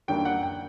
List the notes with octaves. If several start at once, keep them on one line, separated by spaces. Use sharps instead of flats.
F#2 D3 G3 A#3 G5
F#5
G5